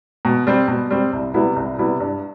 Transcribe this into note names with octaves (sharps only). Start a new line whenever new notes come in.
B2
G3 C4
B2
G3 C4
C2
C3 G3 B3 E4
C2
C3 G3 B3 E4
G2